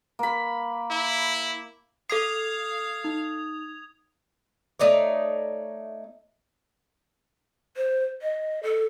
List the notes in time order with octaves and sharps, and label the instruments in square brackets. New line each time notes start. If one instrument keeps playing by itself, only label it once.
[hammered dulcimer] A#3 B5
[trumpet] E4
[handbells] A4 C7 [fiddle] F5 [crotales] D#6 G#6 F7
[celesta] D#4
[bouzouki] A3 D#4 C#5 D5
[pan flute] C5
D#5
A4